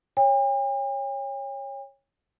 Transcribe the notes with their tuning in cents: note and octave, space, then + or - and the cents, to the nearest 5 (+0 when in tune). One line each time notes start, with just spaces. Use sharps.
C#5 -10 G5 +45